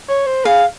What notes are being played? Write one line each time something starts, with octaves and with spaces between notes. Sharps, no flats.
C#5
C5
G#4 F5